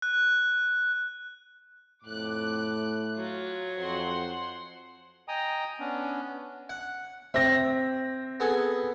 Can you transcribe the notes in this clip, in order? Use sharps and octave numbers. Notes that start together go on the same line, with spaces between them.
F#6
F2 A2 D6 F#6
F#3 F4
F2 C5 F#5 C6
D#5 G5 G#5 A#5 D#6
B3 C#4 D4
F#5
C4 E5 A#6
B3 G#4 A4